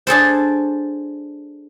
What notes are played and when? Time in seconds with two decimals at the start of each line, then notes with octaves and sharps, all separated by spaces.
0.07 D4 G#4 A4 C5